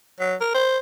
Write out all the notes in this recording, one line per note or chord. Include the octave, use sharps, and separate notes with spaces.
F#3
A#4
C5